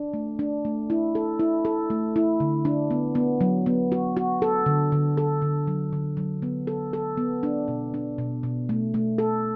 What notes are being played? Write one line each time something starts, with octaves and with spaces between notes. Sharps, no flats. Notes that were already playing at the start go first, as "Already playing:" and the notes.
Already playing: D4
A3
D4
A3
E4
A4
E4
A4
A3
E4
D3
D4
B3
B3
F#3
B3
F#4
F#4
A4
D3
D3
A4
D3
F#3
D3
F#3
B3
A4
A4
B3
D4
B2
D4
B2
B2
A3
A3
A4